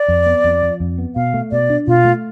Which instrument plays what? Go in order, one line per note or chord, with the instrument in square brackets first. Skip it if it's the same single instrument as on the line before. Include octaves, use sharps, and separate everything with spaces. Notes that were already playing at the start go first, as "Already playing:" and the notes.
Already playing: [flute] D5
[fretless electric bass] F2
B3
F2
F3
F2
B3
[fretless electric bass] B2 [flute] F5
[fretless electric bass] A3
[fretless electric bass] B2 [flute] D5
[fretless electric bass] D4
[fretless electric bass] B2 [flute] F4
[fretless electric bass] A3